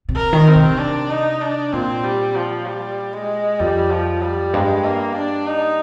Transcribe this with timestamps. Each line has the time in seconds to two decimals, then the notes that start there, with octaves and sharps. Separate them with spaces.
0.09 C3
0.16 A#4
0.33 D#3
0.47 C4
0.55 C3
0.79 D4
1.10 D#4
1.41 D4
1.73 A#2 C4
2.04 G3
2.36 F3
2.66 G3
3.14 G#3
3.60 F2 G3
3.91 F3
4.22 G3
4.54 G2 G#3
4.85 A#3
5.16 D4
5.47 D#4